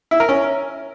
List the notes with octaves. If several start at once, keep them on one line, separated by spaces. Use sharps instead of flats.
E4
A#4
C#4